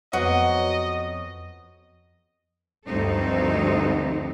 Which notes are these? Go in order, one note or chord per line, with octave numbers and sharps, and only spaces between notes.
F2 F#3 B3 F#4 C5 D#5
D2 G2 F3 C4 D#4 A4